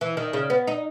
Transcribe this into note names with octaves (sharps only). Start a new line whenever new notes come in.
E3
D#3
C#3
B3
D#4